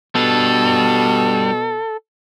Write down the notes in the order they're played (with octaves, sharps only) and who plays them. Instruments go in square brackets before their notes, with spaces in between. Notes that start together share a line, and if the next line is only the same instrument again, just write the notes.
[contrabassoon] B2 [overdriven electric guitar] G3 D4 [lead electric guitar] A4